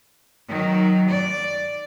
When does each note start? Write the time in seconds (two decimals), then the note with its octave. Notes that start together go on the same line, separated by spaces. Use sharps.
0.48 D#3 F#3
1.09 D5